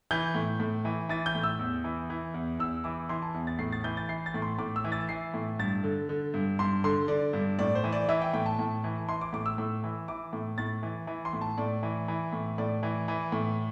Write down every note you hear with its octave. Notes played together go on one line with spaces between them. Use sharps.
E3 G6
A2
A2
E3
E3 A6
G6
A2
E6
E2
E3
E3
E2
E2 E6
E3 D6
E3 C6
A5
E2
A6
A2 C7
A6
E3 G6
A6
E3 C7
A6
A2
C6
A2 D6
E6
E3
A6
E3 C7
A2
G2 A6
D3
D3
G2
G2 C6
D3 C6
D3 D5
G2
A2 D5
C5
E3
D5
E3 E5
G5
A2 G5
A5
A2
E3
E3 C6
D6
A2 D6
E6
A2
E3
E3 D6
A2
A2 A6
E3
E3
C6
A2
A5
A2 D5
E3
E3
A2
A2 D5
E3
E3
A2